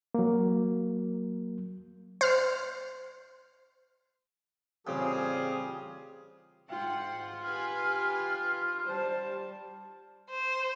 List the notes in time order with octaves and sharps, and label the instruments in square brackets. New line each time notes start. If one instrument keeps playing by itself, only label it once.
[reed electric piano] F#3 A#3
[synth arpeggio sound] C5 F6
[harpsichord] A1 C#3 [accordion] G3 G4 [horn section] C4 F4 G#4
[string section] G#2 F#5 [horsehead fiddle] F4 [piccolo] G5
[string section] G4 B4 G#5 [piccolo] F6
[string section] G3 [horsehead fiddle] C5 A5
[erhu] C5